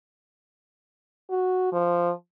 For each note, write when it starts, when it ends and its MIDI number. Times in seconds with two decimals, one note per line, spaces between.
1.30 1.69 66
1.73 2.11 53